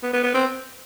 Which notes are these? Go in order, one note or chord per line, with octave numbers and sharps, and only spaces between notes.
B3
B3
B3
C4